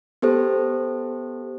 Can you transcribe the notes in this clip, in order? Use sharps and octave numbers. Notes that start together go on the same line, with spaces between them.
B3 G4 A4 C5